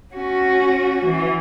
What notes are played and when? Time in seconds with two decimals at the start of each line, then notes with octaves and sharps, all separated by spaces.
0.14 C#4 F#4
1.06 E3